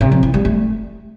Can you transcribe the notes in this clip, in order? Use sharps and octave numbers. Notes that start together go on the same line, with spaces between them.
C3
F3
E3
G3
A3